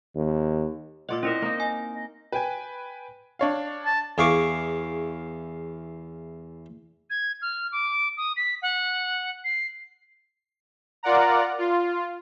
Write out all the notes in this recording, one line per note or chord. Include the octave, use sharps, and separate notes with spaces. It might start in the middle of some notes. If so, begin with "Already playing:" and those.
D#2
A#2 F4 D5 D#5 F#5 C6 D6
C4 C#4 E4 A#4 D#5
A#3 D#4
G#5
D#5
B4 G5 G#5
D4 C#5 F5
A5
E2 G#4 F5 C#6 D6
G#6
F6
D6
D#6
B6
F#5
C7
F4 A#4 D5 F#5 A#5
F4